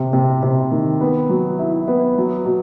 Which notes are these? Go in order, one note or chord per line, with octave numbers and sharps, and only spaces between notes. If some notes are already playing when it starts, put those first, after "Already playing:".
Already playing: C3
C3
C3
D#3
B3
F#3
E4
B3
F#3
B2